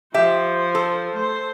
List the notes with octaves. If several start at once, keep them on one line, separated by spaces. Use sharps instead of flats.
F3 G4 C5 E5
A4
A3 C5